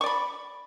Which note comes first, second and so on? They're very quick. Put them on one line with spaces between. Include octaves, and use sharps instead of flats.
C#6 D5 B5